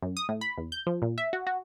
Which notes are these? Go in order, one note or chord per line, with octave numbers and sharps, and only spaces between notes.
F#2
D#6
A2
B5
E2
G6
F3
A#2
E5
F#4
F#4